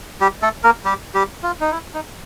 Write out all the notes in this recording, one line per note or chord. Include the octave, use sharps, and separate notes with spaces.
G3 G4
A3 A4
A#3 A#4
G3 G4
G3 G4
F4
D#4
E4
D#4